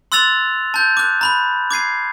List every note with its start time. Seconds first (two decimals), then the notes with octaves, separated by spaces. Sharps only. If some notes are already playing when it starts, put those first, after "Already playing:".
0.12 C6 E6 F#6 A6 F7
0.74 A5 G6
0.97 D6 F#6
1.21 A#5 B5 F#6
1.71 D6 G#6 C7 D#7